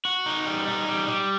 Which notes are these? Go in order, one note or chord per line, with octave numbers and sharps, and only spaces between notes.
F#4
D#4
G3
D#4
G3
G3